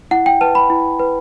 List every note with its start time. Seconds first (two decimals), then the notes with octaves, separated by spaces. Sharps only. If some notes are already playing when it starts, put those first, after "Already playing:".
0.11 E4 F#5
0.26 G5
0.41 B4 A5
0.55 B5
0.70 E4
0.99 B4